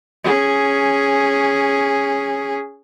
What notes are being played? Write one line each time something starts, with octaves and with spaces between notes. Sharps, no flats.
C#4 G#4